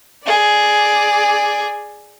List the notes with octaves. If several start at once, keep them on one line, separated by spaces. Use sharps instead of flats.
G#4 D5